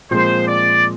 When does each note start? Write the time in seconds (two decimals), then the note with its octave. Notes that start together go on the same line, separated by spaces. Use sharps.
0.11 A#2 F3 G#3 C4 C5
0.47 D5